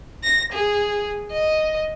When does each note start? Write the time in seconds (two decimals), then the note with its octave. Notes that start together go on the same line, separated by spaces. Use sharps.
0.24 A#6
0.53 G#4
1.33 D#5